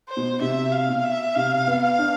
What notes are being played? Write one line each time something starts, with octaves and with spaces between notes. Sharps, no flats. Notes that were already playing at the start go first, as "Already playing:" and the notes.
C5
B2
C3 E5
F5
B2
E5
C3 F5
B3
F5
D4